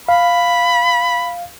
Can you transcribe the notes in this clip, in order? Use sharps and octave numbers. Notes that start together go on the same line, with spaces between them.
F5 B5